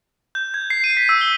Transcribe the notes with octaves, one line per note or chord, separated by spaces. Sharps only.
G6
G#6
C7
D#7
B6
E6
G7